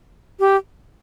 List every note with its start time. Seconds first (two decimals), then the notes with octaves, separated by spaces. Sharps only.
0.40 G4